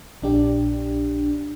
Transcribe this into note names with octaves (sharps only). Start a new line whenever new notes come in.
A#1 D4 G4